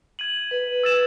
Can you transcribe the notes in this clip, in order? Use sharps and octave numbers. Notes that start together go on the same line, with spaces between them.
G#6 D#7 F#7
B4
E6 A6 E7